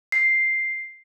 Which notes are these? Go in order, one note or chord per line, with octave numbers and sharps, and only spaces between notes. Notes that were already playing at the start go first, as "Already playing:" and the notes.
C7